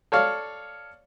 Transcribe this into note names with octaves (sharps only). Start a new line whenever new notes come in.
A4 C#5 D5 F5